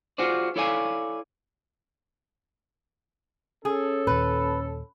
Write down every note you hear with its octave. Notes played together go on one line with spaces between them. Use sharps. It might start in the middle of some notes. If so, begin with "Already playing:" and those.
F4 F#4 G#4 C5 D5
E4 A4 C#5 D5 F5 G#5
C#4 G#4 A4
D#2 A#2 B4